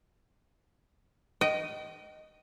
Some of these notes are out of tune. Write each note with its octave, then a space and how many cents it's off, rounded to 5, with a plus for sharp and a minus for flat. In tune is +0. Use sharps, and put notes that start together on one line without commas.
D#5 +0 G5 -35